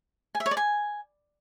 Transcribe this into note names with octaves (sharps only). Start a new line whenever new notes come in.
G#5
E5
C#5
D5
G#5